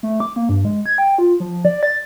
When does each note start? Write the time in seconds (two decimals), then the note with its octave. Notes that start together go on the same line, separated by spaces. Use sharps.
0.03 A3
0.20 D6
0.36 A#3
0.49 G2
0.65 G#3
0.86 G#6
0.98 G5
1.18 F4
1.40 F3
1.53 F3
1.65 D5
1.83 A6